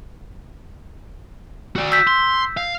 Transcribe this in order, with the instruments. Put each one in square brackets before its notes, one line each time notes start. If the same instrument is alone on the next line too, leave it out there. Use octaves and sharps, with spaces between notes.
[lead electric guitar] F#4 D5
[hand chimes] E6 G6 B6
[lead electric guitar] C6
F5